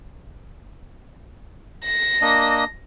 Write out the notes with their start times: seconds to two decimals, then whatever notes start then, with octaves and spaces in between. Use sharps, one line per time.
1.85 A#6
2.22 A#3 D4 D#5